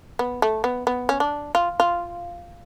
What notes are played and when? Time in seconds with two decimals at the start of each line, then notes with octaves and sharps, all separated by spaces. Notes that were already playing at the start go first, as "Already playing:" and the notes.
0.19 B3
0.42 A3
0.64 B3
0.87 B3
1.09 C#4
1.20 D4
1.55 F4
1.80 F4